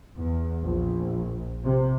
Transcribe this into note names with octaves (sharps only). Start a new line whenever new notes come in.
E2
A#1
C3